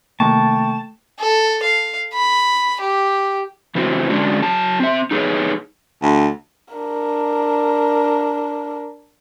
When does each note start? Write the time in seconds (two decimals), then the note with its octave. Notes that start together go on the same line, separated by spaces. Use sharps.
0.20 C3 D#3 A3 A#3 G5 A5 C#6
1.19 A4
1.63 F5
2.13 B5
2.81 G4
3.75 C#3 E3 C4 E4 F#4
4.10 D3 G#3 C#4 D4 F#4
4.43 F#3 A5
4.80 C4 E5
5.11 D#4 G#4 B4 C#5
6.02 D2
6.74 D4 A#4